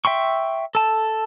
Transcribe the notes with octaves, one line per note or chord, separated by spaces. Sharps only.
E5 G5 C6 C#6
A4 A5